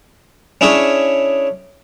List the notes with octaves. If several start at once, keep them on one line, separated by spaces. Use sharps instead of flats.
C#4 D4 E4 G#4 C#5